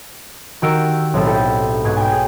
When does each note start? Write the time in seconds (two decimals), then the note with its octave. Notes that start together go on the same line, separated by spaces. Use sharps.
0.62 D#3 F#4 G4 A#4 E6 D7
1.14 B1 A2 C4 A4
1.26 E4 A4 G5
1.84 G#2 B2 G#6
1.97 G5 G#5
2.12 G#4